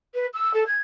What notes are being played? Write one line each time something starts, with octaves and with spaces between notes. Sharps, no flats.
B4
E6
A4
G#6